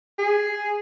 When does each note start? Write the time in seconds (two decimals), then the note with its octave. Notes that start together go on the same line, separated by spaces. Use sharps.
0.19 G#4